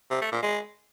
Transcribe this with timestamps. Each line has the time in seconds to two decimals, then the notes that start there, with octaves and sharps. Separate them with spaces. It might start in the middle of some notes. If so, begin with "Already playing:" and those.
0.11 C3
0.22 A3
0.32 A#2
0.43 G#3